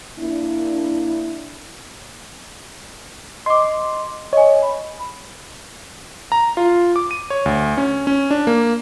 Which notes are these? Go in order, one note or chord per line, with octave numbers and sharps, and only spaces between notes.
A#3 D4 E4
D#5 C6 D6
C#5 D#5 G#5
B5
A#5
F4
D6
D#7
C#5
D2
C#4
C#4
D4
A#3